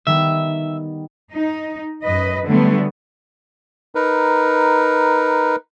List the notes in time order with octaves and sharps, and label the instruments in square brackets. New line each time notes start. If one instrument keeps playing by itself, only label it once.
[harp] D#3 G3 B3 [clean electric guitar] E5
[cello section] D#4
F#2 B4 D#5
D3 F#3 G3 A3 B3
[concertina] D#4 A#4 B4